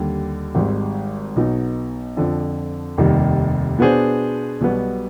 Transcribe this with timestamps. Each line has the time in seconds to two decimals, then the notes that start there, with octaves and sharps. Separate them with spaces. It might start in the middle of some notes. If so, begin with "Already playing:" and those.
Already playing: D#2 D3 G3
0.55 G#1 G#2 G3
1.36 B1 B2 B3 D#4
2.17 F2 D3 F3
2.98 F1 D#2 D#3 G3
3.79 B2 B3 D4 G#4 C5
4.61 B1 B2 G3 B3